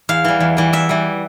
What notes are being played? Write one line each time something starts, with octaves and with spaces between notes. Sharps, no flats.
E2 F5
E3 G3
E2
E3 G3
E2 E5
E3 G3